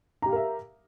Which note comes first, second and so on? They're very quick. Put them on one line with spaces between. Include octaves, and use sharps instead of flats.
A#5 G4 F5 A#4 E5